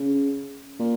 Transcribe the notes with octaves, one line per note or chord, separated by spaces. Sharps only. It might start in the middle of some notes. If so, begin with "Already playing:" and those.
Already playing: C#3
A#2